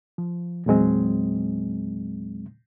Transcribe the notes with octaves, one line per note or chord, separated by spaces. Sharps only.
F3
E2 A#2 F#3 G#3 C4